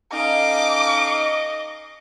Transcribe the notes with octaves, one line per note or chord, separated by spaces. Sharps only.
C#4 D#4 A4 D#5 F5 D6